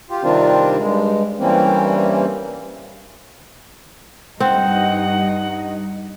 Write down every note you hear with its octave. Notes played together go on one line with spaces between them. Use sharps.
F4 G4
C3 D#3 G3 C4 D4 F4
G2 G#3
G2 E3 G3 A#3 C4 C#4
G2 C4 D#4 F#5